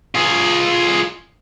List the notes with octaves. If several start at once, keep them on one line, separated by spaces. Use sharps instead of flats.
F4 G#4